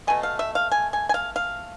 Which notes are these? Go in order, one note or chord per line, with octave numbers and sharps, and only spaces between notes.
B2 A3 G#5
F5
E5
F5
G#5
G#5
G#5
F5
F5